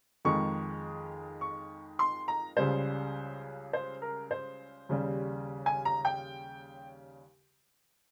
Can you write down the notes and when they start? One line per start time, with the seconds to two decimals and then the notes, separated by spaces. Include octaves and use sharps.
0.25 F2 D#3 G#3 C#6
1.41 C#6
1.99 C6
2.28 A#5
2.57 C#2 C#3 G3 C5
3.73 C5
4.02 A#4
4.31 C5
4.89 D#2 C#3 G3
5.66 G#5
5.85 A#5
6.05 G5